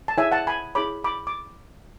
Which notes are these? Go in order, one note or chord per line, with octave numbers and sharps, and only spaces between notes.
A5
E4 G#4 C#5 E5 G#5
F#5 A5
G#5 B5
E4 G#4 C#5 B5 D6
B5 D6
D6